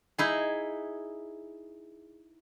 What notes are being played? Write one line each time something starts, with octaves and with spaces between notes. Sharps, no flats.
D#4 E4 G#4